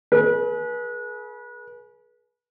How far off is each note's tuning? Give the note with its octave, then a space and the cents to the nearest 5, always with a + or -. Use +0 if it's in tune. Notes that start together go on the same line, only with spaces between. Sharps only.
G#4 +35 B4 -35